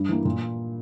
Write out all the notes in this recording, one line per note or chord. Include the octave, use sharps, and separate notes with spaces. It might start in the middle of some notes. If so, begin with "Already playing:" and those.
Already playing: G2
E3 A#3
A#2